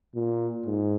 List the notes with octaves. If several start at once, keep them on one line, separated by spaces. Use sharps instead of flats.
A#2
G#2